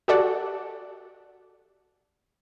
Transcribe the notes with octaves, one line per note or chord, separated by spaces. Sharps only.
F#4 G4 A4 D5 F#5